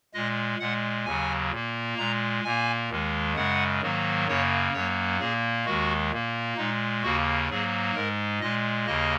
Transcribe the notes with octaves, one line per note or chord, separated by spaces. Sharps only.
A#2 G#3 D#5
A#2 G#3 F#5
D#2 C#3 F#3 G#5
A#2 A#3
A#2 G#3 A#5
A#2 A#3 G#5
D#2 D#3 G#3
F#2 C#3 G#3 F#5
G#2 D#3 F#3 A#3
F#2 C#3 A#3 C#5
F#2 F#3 A#3 C#5
A#2 A#3 G#4
D#2 D#3 G#3 F#4
A#2 A#3
A#2 G#3 D#4
D#2 C#3 A#3 F#4
G#2 F#3 A#3 G#4
G#2 G#3 A#4
A#2 G#3 D#5
D#2 C#3 A#3 D#5